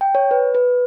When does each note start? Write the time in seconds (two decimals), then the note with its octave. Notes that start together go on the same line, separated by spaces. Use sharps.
0.01 G5
0.15 C#5
0.31 B4
0.55 B4